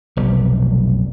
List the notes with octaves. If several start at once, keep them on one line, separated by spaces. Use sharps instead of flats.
F1 B1 G3